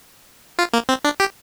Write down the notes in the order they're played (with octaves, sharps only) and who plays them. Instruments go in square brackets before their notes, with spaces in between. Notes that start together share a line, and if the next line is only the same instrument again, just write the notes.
[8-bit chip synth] F4
A#3
C4
D4
G4